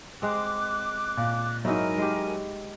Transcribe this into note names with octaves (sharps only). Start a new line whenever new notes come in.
G#3 C4 D6 F#6
A#2
G#2 F#3 D#4 E4 A#4 G#5
G#3 G4